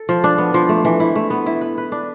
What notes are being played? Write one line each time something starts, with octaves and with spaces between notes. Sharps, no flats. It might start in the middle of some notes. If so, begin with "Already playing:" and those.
Already playing: A4
F3
D4
B3
F3
A3
E3
E4
A3
B3
E4
B4
B4
D4